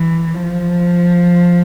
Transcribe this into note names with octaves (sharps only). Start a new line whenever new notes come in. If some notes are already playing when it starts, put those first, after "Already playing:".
Already playing: E3
F3